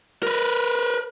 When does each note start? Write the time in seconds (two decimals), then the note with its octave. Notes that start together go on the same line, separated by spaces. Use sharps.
0.23 A#4 B4